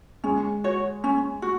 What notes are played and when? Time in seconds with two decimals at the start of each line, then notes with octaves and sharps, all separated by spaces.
0.24 G#3 C#4
0.64 F#4 C#5
1.04 C#4
1.42 F#4